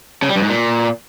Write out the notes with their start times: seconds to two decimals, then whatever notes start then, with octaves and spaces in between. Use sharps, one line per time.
0.22 C#3
0.29 G3
0.36 G2
0.43 G#2
0.49 A#2